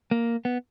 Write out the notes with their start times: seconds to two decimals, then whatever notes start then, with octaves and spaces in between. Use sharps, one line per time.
0.11 A#3
0.45 B3